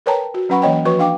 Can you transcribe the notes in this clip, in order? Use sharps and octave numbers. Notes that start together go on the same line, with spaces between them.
A#4 B4 C#5 G5 A5 A#5
F#4
F#3 C#4 B4 F#5 B5 C#6
E3 A#3 C#4 C#5 D#5 G5
F3 F#4 B4 C#5 C#6
D4 F5 G5 D6